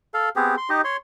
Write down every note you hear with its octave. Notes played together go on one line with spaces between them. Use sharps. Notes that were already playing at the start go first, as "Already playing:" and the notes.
A4 F5
B3 C4 G4 G#4
C6
D#4 G4 D#5
C#5 C6